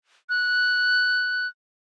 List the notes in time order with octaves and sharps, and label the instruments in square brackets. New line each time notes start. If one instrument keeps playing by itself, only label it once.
[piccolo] F#6